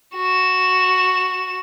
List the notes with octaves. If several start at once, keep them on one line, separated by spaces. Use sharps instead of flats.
F#4 E7